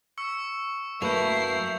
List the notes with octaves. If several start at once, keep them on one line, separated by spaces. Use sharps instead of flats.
C#6 E6 C#7
F#2 A3 A#3 E4 B4 G6 C7 F7